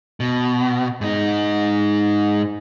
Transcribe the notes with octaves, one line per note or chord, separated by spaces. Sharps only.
B2
G#2 D#4